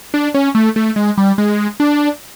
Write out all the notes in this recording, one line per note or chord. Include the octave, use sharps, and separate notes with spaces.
D4
C#4
A3
A3
G#3
G3
G#3
D4